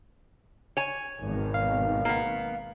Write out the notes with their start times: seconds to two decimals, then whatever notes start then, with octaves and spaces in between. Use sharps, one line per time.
0.77 C#5 G#5
1.25 G#1 B2 D#3
1.54 F5
2.05 A#3 B3